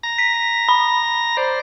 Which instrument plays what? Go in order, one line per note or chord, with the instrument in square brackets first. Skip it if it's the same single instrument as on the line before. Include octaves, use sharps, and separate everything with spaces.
[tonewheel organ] A#5 A#6
[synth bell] B6
B5
[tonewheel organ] C5 D5